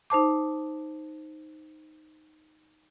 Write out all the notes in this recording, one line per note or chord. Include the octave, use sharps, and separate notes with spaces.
D#4 C5 A5 D6